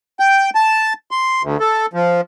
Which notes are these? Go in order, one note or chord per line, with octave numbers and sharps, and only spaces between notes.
G5
A5
C6
D2
A4
F3